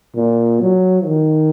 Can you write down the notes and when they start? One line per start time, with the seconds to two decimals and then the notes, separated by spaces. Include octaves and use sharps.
0.16 A#2
0.60 F#3
1.05 D#3